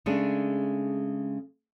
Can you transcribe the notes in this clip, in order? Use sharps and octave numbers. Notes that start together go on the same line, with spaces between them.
C#3 G#3 A3 D4 G#4